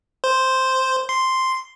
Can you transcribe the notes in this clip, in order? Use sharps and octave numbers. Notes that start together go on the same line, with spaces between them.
C5
C6